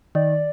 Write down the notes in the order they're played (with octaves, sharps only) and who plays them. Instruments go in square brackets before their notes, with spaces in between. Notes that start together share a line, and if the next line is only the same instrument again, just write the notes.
[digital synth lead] D#3 [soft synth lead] D5